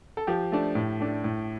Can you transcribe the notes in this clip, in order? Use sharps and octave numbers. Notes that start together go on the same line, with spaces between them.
A4
F3 G4
A3 D4
A2
A3 D4
A2